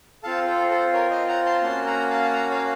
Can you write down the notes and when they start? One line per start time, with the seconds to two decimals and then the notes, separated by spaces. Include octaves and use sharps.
0.23 C4 F4 A4 F5 A5
0.46 A4 C5
0.70 A4 C5
0.93 A#4 C#5
1.10 C5 D#5
1.28 F#5 A#5
1.45 A5 C6
1.63 A#3 C#4 F#4 A5 C6
1.86 F#5 A#5
2.10 F5 A5
2.23 A5
2.33 F#5 A#5
2.50 C#5 F5